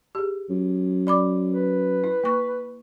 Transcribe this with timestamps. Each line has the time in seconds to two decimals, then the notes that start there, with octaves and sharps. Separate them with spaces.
0.15 G4 G#4
0.49 F#2
1.07 D5 B5 D6
1.49 B4
2.04 E4
2.24 A#3 C#6